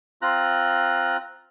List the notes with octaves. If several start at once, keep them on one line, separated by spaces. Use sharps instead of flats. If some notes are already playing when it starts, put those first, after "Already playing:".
C4 F4 A#5 F#6